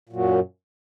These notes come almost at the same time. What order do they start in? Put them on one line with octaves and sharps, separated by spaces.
A#2 F#3 F#2